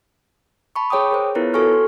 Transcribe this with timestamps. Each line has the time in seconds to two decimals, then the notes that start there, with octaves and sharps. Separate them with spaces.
0.76 A5 B5 C#6
0.90 G#4 C#5 G5 D6 D#6
1.11 G#4 A#4 C5
1.35 B3 E4 F4 A#4 B4 C#5
1.54 F#4 A4 G#5 C#6 F6
1.73 C6